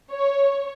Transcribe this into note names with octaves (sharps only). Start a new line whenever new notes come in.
C#5